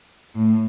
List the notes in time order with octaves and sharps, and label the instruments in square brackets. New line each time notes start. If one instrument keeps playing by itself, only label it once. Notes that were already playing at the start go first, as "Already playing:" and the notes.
[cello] A2